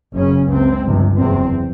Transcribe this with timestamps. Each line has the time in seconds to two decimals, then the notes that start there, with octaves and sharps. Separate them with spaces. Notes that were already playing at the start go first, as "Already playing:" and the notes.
0.14 F#1 F#2 C#3 C#4
0.48 C#2 C3 C4
0.84 G1 F2 C3
1.18 F#1 E2 C3 C4